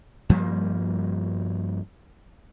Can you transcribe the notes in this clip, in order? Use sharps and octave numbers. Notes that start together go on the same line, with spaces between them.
G2 F3 G3 A#3